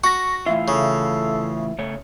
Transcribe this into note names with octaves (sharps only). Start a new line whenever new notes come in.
F#4 C#6 A#6
A2 E3 F4 E5
C#3 A4
C#3 A3 C#5